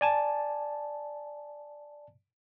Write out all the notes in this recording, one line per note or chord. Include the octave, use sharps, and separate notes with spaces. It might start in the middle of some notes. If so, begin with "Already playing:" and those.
D5 G#5 A5